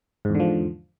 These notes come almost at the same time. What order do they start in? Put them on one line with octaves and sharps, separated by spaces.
G#2 E2 D3 F3